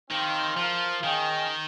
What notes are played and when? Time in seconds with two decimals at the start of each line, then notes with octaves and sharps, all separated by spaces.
0.10 D#3 C4 D#4 G4 C5 F5
0.57 F3 F4 A#4 F5
1.04 D#3 C#4 G#4 D#5 G5